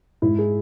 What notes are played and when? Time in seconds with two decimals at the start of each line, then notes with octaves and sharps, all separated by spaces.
0.22 G#2 E4
0.38 G#4